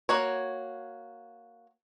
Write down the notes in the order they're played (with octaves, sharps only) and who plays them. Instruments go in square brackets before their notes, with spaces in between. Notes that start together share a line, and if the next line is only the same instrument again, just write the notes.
[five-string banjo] A#3 F#4 C#5